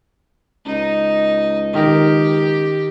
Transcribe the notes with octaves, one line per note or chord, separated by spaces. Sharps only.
C#2 D#4
D#3 G4 A#4